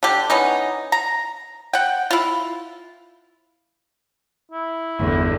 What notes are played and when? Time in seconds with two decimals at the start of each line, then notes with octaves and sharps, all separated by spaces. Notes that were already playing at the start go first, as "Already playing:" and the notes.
0.03 D3 G4
0.30 E3 B3 C#4 D#4
0.92 A#5
1.73 F#5 G5
2.11 E4 F4
4.51 E4
5.00 G1 E2 D3